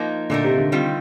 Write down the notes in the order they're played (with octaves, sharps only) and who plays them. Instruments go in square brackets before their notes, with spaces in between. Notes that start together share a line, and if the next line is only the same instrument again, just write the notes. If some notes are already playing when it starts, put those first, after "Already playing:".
Already playing: [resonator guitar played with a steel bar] F3 A#3 D#4
[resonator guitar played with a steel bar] A#2 A3 D#4 A#4 [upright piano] D3
[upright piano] C3
D3
[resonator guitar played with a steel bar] D#3 G3 C4 F4